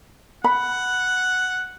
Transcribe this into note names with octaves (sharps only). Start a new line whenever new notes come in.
F#5 B5